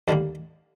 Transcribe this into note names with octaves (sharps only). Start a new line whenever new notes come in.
D#2 D3 G3 A#3 A5